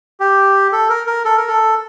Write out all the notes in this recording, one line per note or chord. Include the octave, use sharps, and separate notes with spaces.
G4
A4
A#4
A#4
A4
A#4
A4